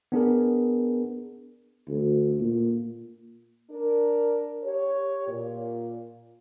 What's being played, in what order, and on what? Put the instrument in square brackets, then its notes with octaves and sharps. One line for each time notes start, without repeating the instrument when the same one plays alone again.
[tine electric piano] B3 D4 G#4 A#4
[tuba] D2
A#2
[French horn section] D4 A#4
G4 C#5
A#2